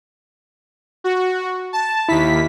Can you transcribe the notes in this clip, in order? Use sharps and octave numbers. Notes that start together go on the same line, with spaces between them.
F#4
A5
D#2 E4 B6